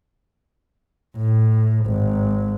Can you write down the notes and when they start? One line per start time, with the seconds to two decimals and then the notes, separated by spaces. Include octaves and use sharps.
1.17 A2
1.85 G#1